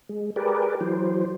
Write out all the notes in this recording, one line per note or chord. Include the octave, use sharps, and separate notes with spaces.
G#3
G4 G#4 A#4 B4 D5
E3 F#3 C5